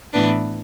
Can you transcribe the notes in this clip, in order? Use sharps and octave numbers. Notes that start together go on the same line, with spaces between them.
A2 E3 B3 D4 B4